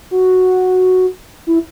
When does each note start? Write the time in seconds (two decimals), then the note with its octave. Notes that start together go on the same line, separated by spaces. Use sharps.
0.11 F#4
1.47 E4